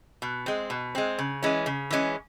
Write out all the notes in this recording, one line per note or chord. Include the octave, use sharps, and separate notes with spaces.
B2
G#3 C4
B2
G#3 C4
C#3
E3 G#3 C#4
C#3
E3 G#3 C#4